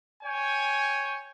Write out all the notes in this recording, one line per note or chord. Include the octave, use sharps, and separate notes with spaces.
C#5 G5 G#5